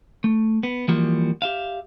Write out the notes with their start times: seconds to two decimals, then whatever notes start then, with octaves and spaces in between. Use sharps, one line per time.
0.24 A3
0.63 B3
0.88 E3 F3 G3 A#3 F#4
1.42 G4 E5 F5